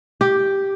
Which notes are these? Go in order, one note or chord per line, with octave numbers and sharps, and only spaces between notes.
G4